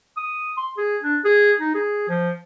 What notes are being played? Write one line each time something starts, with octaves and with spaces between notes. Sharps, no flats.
D#6
C6
G#4
D4
G#4
D#4
G#4
F3